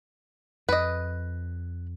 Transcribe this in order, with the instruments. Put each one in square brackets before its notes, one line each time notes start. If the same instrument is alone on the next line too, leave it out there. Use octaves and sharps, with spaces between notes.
[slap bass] F2 [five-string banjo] B4 D#5